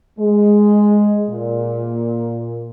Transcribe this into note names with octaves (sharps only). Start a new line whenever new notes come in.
G#3
A#2